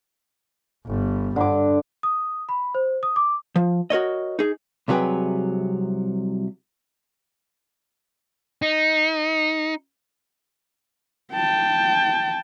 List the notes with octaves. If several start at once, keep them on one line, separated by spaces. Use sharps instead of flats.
G1 G3
G2 D3 D6
D#6
B5
C5
D#6
D6
F3
F#4 A#4 C#5 D#5
D#4 G#4
C2 C3 F#3 G#4 B4 G5
D#4
G5 A5